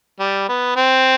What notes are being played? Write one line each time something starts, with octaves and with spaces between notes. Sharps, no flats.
G3
B3
C4